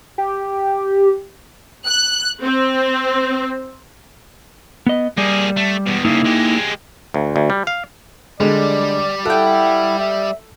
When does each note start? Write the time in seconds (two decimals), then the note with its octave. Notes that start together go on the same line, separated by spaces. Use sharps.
0.18 G4
1.87 F#6
2.44 C4
4.87 B3 D#5
5.18 G3 A#3 G#4
5.57 A3
5.87 E2 B2
6.05 G2 C#3 A#3 D#4 E4
6.25 G#3 G4
7.14 D2
7.36 D2
7.50 G3
7.67 F5
8.40 D3 G3 G#3 D5
9.25 E4 A4 F#5 G5
9.99 E5